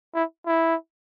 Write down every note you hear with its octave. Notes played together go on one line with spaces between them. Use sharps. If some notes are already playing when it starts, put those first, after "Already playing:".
E4
E4